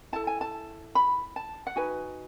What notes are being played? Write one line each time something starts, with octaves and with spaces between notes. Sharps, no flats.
E4 A4 A5
G#5
A5
B5
A5
F#5
D#4 F#4 B4 G#5